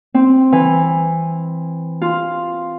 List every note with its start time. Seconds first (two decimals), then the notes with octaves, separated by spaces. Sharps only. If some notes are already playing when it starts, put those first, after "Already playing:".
0.14 C4
0.52 E3
2.02 F4